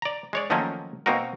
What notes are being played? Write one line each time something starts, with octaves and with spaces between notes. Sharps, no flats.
D5 A#5
G#3 C#5 D5
D#3 F3 F#3 A3 A#3 C#4
B2 A#3 C4 D#4 F#4 A#4